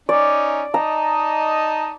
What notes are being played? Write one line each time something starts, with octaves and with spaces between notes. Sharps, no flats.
C#4 D#4 D5
D#4 D#5 A5 A#5